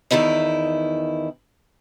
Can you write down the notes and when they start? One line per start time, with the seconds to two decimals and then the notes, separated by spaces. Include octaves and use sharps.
0.11 E2 B2 D#3 E4 D#5